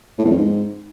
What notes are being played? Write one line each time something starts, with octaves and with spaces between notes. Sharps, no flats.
A2
E2
F2
G#2